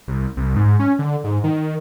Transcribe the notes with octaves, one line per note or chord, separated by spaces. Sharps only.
C2
C2
G#2
C#4
D3
G#2
D#3